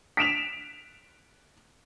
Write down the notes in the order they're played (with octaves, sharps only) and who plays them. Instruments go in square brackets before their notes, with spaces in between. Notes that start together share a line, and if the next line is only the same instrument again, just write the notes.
[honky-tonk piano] B6 D7 E7 F7